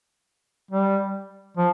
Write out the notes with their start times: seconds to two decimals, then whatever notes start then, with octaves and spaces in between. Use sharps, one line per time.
0.71 G3
1.57 F3